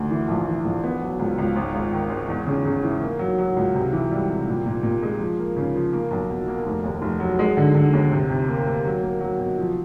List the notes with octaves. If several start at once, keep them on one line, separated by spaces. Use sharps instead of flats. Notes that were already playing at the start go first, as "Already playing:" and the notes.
Already playing: D2
E3
A#1
E3
A#1
B3
F#3
C#2
C#2
G#1
G#1
D#3
G#1
E2
C#3
C#3
E3
A#3
F#3
F#3
C#2
C3
E3
G3
C3
A#2
A#2
A#2
G#3
F3
A#3
C#3
F3
A#3
B1
B2
A#3
F1
D#2
F1
F#3
G#3
D3
D3
D#2
C3
C3
A#3
A#3
F#3
A#3
F#3
B2
F3